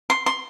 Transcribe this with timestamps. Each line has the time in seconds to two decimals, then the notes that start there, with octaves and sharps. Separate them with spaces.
0.10 C6
0.26 C6